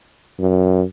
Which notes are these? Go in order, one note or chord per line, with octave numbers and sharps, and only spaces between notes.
F#2